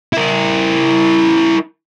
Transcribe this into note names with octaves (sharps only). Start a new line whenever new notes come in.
E4 A#4